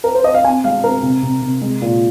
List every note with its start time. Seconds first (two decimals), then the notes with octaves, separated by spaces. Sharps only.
0.04 A#4
0.15 C5
0.24 D#5
0.34 F5
0.44 C4 G#5
0.64 G#3 F5
0.84 C4 A#4
1.03 C3
1.22 C3
1.42 C3
1.61 G#3
1.82 A#2